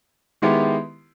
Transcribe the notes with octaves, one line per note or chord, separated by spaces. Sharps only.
D#3 G#3 B3 E4 G4